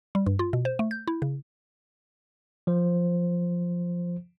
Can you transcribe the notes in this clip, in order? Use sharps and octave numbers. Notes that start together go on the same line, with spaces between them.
G3
G2
F4
B2
C5
A3
G6
E4
C#3
F3 C5